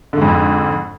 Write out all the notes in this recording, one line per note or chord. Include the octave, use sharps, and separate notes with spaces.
F2 G#2 D3